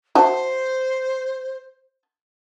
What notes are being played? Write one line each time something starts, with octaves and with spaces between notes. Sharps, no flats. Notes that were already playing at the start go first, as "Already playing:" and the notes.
F#4 C5 E5 A5